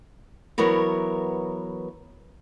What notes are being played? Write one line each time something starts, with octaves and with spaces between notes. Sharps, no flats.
E3 F#3 B3 A#4 C#5